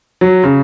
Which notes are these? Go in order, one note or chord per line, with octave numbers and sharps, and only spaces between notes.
F#3
C#3